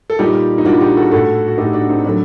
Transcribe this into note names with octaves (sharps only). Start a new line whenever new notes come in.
A4
A#2 G3 D#4 G4
D#4
A#2 G3 D4 F#4
D#4 G4
F#4 A4
A2 A3 F#4 A4
F#4
A2 A3 D#4 G4
D4 F#4
C4 D#4
A2 F#3 A3 D4